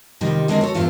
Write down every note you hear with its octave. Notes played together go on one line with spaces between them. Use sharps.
C3 D#3 G3 F4 D#5
D3 G#3 A#3 C4 D4 F#4
F#4 A4 C#5
E2 G2 E3 D4 F4 A4